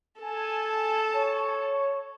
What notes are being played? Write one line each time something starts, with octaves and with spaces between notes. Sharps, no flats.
A4 G#5 A5
C#5